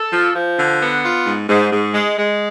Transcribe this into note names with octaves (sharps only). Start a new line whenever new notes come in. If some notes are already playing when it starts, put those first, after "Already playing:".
Already playing: A4
F3
F3
D3
B3
F4
G#2
G#2
G#2
G#3
G#3